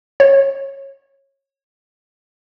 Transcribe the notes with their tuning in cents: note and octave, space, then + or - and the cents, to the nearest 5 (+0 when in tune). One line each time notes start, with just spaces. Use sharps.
C#5 -20